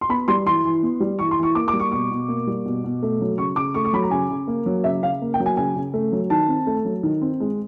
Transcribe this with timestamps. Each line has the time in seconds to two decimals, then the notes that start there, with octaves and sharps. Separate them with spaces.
0.01 C6
0.09 B3 B5
0.28 G3 C6
0.46 E3 C6
0.64 E3
0.83 B3
1.00 G3
1.19 E3 C#6
1.31 C6
1.37 E3
1.43 C#6
1.55 A#3 D6
1.68 D6
1.73 G3
1.80 C#6
1.92 B2 C#6
2.11 B2
2.28 A#3
2.47 G3
2.65 B2
2.84 B2
3.03 A3
3.21 F#3
3.38 C#3 C#6
3.56 C#3 D6
3.74 A3 C#6
3.85 C#6
3.93 F#3 B5
4.03 A#5
4.11 C#3 G#5
4.30 C#3
4.47 A#3
4.66 F#3
4.84 C#3 E5
5.02 C#3 F5
5.22 A#3
5.34 G5
5.40 F#3
5.46 G#5
5.57 C#3 G#5
5.76 C#3
5.94 A3
6.12 F#3
6.30 D#3 A5
6.48 C4
6.67 A3
6.85 F#3
7.03 D#3
7.22 C4
7.40 G#3